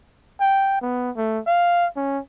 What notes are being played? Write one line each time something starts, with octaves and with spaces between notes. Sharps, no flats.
G5
B3
A3
F5
C#4